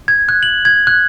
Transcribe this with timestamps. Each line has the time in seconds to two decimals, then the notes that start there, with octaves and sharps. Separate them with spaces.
0.08 G#6
0.29 F#6
0.43 F#7
0.65 G#6
0.87 F#6